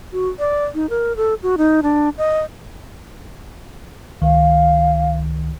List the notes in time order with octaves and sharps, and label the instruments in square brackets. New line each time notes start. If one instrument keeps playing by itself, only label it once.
[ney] F#4
D5
D#4
A#4
A4
F#4
D#4
D4
D#5
[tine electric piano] C#2 D#3 [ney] F5